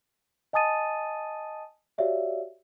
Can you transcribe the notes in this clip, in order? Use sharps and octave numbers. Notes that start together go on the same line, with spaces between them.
D#5 G#5 A5 D#6 A6 D#7
F#4 G4 C#5 D5 E5 F5